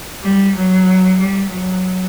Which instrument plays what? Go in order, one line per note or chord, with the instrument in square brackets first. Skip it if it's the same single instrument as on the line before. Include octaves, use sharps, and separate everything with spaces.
[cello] G3
F#3
G3
F#3